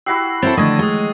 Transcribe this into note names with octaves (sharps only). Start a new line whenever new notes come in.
E4 F#4 G4 E6 C7
C4 E4 A4 C#5 A6
D3 D#3 F3 A3 D4 D#5 C#6 G#6
G#3 D#6 A6